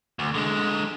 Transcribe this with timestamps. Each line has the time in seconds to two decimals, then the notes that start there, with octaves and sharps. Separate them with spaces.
0.19 D2
0.34 D3 G#3